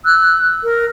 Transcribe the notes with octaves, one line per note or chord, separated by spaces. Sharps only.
E6 F#6
A#4